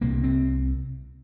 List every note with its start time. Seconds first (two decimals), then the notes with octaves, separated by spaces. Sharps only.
0.01 C2 C3 A#3
0.23 C4